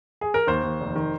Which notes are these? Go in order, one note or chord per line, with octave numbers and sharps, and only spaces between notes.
G#4
A#4
D#2 C5
D#2
F1
D#3